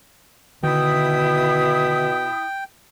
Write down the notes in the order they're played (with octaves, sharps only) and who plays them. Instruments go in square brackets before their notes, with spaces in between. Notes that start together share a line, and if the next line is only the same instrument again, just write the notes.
[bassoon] B2 [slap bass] D3 D#3 [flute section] E4 D#6 [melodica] G5